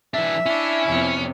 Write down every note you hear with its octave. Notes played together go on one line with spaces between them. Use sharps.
E3 D4 E5
C#4 D4 E4
F2 C3 B3